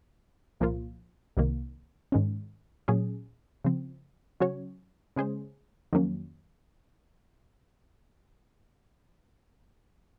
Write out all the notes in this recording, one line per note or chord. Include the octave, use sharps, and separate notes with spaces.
C2 A#2 F3 A#3 F4
C2 C3 D#3 A#3
G#2 D#3 G#3 C#4
A#2 F#3 C#4 G#4
C#3 F3 C4
C#3 F#3 C#4 F#4 C#5
C#3 G#3 C#4 G#4 C5
F2 D#3 F#3 A#3 C#4